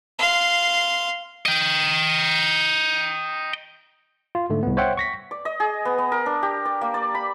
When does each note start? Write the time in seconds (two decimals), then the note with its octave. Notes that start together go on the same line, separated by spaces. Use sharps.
0.19 F5 C6
1.46 D#5 G5
4.35 F4
4.50 G#2 D3 A3
4.63 C2 B3
4.77 C5 C#5 E5 F#5 G5
4.97 C#6 A#6 B6
5.31 D5
5.45 D#5
5.60 G#4
5.85 B3
5.98 B3
6.12 A#4
6.26 D4
6.42 G4
6.65 D5
6.81 A#3
6.94 D5
7.15 B5